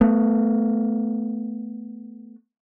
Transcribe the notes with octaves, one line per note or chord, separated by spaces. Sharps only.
A3 B3